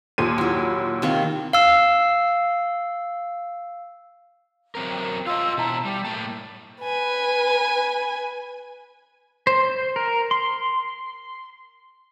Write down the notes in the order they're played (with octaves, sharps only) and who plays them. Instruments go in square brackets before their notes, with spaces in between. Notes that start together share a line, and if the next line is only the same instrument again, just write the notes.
[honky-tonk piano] D#2 A#2 D#7
[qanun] F#3 E4
C3 D#3 A#3
[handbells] F5 E6
[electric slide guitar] F#3 C4 A#4
[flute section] G5
[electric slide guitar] F4 D#5 [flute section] F5 C6 E6
[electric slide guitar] B2 E4 [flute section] G5 A5 A#5
[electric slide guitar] G3 [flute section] G5
[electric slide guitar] A2 A#3 A5
[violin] B4 G#5
[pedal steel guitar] C5
A#4
C6